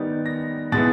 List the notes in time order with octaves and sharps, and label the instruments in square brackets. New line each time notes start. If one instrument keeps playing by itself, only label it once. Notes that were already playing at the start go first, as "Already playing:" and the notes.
Already playing: [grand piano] D#3 G3 B3 D#4 A6
A#6
B2 G#3 B3 E4 A6